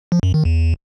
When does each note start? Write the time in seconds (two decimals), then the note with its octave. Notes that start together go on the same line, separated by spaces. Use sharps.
0.12 F3
0.23 F#2
0.34 D#3
0.45 E2